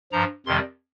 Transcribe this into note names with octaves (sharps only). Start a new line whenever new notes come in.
G2 F3 A#5
F2 C3 D#3 G3 C6